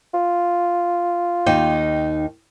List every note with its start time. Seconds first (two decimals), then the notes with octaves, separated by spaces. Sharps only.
0.14 F4
1.46 D#2 D#4 G5